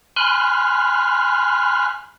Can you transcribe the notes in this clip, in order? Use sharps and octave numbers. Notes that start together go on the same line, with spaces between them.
G#5 B5 C6 F6 F#6